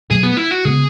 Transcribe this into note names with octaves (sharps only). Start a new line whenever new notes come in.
B2 F#3 A3 G#4
B3
E4
F#4
C#3 G#3 B3 G#4